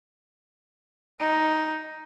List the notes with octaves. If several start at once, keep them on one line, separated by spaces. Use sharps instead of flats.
D#4